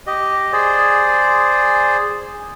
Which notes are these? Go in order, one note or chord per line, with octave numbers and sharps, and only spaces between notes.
G4 D#5
G#4 C5 D5